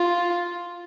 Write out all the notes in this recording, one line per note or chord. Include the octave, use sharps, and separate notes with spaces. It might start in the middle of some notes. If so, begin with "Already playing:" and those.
Already playing: F4